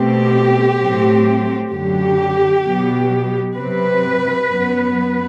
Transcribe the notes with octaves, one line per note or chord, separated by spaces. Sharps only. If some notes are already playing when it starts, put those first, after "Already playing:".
Already playing: B2 A3 C4 G4
A2 F#3 A3 C4
F#2 D3 F#3 G4
B2 F#3 B3
C3 F#3 C4 B4
F#2 F#3 B3